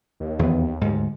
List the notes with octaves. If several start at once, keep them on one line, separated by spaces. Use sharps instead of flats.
D#2
E2 D#3 B3
D2 G#2